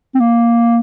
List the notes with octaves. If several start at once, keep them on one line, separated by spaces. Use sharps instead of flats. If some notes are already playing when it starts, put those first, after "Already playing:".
C4
A#3